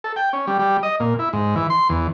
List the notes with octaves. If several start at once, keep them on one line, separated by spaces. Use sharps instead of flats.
A4
G5
C#4
G3
G3
D#5
A#2
E4
G#2
E3
C6
E2